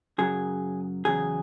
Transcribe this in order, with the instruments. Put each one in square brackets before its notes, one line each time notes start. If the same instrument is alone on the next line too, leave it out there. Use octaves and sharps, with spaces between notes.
[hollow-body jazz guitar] F#2 C#3 F#3 G#4
E2 C#3 F#3 G#4